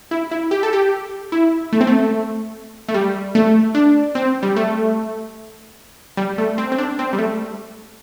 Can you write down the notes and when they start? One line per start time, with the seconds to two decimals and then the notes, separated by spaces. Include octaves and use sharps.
0.11 E4
0.31 E4
0.51 G4
0.63 A4
0.73 G4
1.32 E4
1.73 A3
1.81 C4
1.87 A3
2.88 A3
2.94 G3
3.35 A3
3.75 D4
4.15 C4
4.43 G3
4.56 A3
6.17 G3
6.38 A3
6.58 C4
6.72 C4
6.78 D4
6.99 C4
7.13 G3
7.19 A3